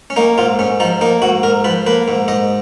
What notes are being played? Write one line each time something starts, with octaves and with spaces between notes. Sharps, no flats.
C#4
A#3 D#4
G#2 F4
G#2 C#4
F3 D#4
A#3 D#4
G#2 F#4
G#2 A#4
F3 B4
A#3 B4
G#2
G#2 D#5